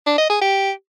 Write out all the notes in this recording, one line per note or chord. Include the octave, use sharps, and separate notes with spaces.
D4
D#5
G#4
G4